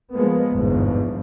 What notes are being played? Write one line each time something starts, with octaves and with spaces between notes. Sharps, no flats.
F3 G#3 A#3 B3
G1 E2 G#2 B2 F3